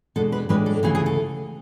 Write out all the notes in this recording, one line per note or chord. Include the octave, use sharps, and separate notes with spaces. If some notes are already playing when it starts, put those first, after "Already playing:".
E2 B2 G#3 D4 A4
B4
A2 E3 G#3 D4 B4
A4
D2 C#3 E3 A3 G#4
G#4
A4